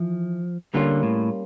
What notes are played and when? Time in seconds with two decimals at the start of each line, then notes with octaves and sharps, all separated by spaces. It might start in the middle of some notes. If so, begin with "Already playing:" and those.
Already playing: E3 F3
0.74 D3 G3 A#3 C#4 F4
1.03 A2